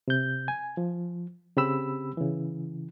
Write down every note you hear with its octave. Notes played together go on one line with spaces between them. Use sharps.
C3 G6
G#5
F3
C#3 C4 G4 B5 E6
C#3 E3